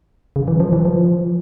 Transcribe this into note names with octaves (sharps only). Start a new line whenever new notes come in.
C#3
E3
F3
E3
F3